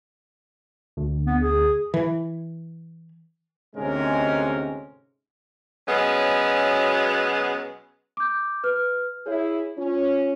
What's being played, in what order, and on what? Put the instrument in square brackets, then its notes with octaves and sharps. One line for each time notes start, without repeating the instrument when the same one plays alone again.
[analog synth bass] D2
[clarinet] B3
G#4
[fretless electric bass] E3
[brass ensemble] D2 G#2 C3 G#3 C#4 A#4
[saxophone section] B2 F#3 G#3 B3 C#4
[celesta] D6 G6
B4 F6
[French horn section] E4 G#4 [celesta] C#5
[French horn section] C#4 [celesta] F4